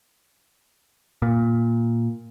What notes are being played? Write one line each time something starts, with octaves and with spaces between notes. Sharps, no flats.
A#2